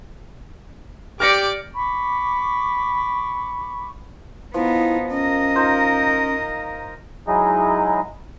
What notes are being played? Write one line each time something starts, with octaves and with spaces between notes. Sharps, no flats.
G4 D5 D6 F6 A#6 C#7
B5 C#6 D6
F3 B3 D#4 E4
C#4 A#4 D#5
D#4 F4 C5
F#3 G#3 D#4 E4 G#4 D#5